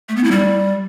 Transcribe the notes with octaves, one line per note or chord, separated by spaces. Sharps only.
A3
B3
E4
G3